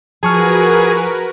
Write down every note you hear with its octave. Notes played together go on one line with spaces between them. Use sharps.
F3 F#4 G#4 A#4 B4 A5 C#6 F6